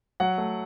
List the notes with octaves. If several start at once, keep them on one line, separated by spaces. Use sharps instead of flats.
F#3 F#5
A3